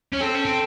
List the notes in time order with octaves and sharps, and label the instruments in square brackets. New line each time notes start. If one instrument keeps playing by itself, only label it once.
[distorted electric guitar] C#4
[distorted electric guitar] C4 [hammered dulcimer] A4
[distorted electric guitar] C#4
C4